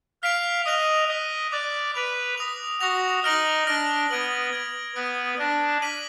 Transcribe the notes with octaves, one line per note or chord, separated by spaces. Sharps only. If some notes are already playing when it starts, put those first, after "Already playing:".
F5 F6 B6 D7 F7
D#5 D#6 F#6 B6 F7
D#5 D#6 F#6 B6 F7
D5 D6 F#6 D7 F7
B4 D6 F#6 D7 F7
D#6 A#6 F7
F#4 D#6 A#6 F7
D#4 F6 A#6 D7 F#7
D4 F6 A#6 D7 F#7
B3 G#6 D7 F#7
G#6 D7 F#7
B3 D#6 F#6 A#6 D7
D4 D#6 F#6 A#6 D7
D6 F6 B6 D#7 F#7